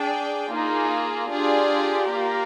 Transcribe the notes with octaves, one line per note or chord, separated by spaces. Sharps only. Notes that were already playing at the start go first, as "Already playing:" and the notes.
Already playing: D4 G#4 D5 G5
A#3 D#4 F4 G#4
D4 F4 G4 G#4 D5
A#3 F4 A#4 D5 F5